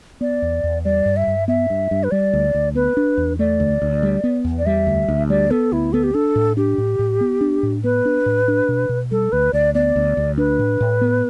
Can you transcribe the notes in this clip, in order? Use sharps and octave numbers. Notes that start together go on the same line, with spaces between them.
B3 D5
E2
E2
G3 D5
G2
E5
G2
B3 E5
G2
G2
B4
G3 D5
D2
D2
B3 B4
D4
E2
A3 D5
D2
D2
G3
B3
E2
D5
G3 E5
D2
D2
G3 D5
B3 A4
D2 E4
B3 A4
G4
D4 A4
A2
D4 G4
A2
A2
B3
D4
A2
B3 B4
D4
A2
D4
B2
B2
G3 A4
D2 B4
D2 D5
B3 D5
D2
D2
D4 B4
A2
A2
B3